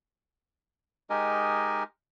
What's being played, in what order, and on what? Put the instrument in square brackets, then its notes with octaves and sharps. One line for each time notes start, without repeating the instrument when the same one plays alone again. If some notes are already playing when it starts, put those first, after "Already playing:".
[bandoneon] G#3 D#4 G4 A#4 D#5 G#5